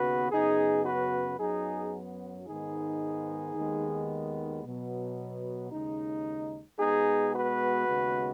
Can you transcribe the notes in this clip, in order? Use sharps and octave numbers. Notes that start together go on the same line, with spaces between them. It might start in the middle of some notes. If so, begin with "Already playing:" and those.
Already playing: D#2 C#3 B3 F#4 B4
F#2 C#3 B3 D#4 G#4
F#4 B4
F#2 F#3 B3 D#4 G#4
G#2 D#3 G#3 B3 D#4 G#4
D#2 D#3 G#3 B3
B2 F#3 B3
D#2 C#3 G#3 D#4
B2 G#3 B3 D#4 G#4
F#4 B4
D#2 C#3 G#3 B3